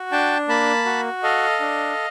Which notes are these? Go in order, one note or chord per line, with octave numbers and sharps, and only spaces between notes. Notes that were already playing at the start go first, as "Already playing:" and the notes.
Already playing: F#4
D4 G5 A5
A#3 A5 B5
F#4
A4 D#5 F5
D4